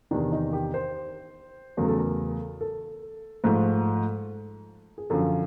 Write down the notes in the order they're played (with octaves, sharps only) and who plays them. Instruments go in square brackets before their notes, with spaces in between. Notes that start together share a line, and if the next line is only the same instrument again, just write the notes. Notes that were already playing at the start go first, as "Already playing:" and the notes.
[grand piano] E2 C3 D#3 D4
D#4
G4
C5
E2 C#3 F#3 A3 A#4
A4
A#4
A4
G#2 F3 A3
G#4
F#2 D3 F3 A4